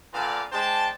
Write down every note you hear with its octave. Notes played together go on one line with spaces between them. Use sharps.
A#2 D3 B3 D5 F5 A5
G#3 D4 C5 G5 A5